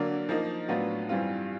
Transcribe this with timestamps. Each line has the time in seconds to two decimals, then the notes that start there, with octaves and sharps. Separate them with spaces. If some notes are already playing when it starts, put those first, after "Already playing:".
Already playing: D3 F#3 A#3 D4
0.29 F3 A#3 D#4
0.68 A2 F#3 B3 D4 F4
1.09 G2 E3 G3 C4 F4